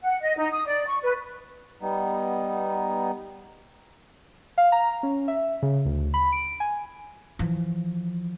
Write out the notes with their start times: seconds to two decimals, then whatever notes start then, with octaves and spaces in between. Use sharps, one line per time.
0.03 F#5
0.20 D#5
0.36 D#4
0.51 D#6
0.66 D5
0.87 C#6
1.02 B4
1.82 G3 B3 D#4
4.58 F5
4.72 A#5
5.03 C#4
5.28 E5
5.63 C#3
5.85 D2
6.14 B5
6.32 D7
6.60 G#5
7.39 E3 F3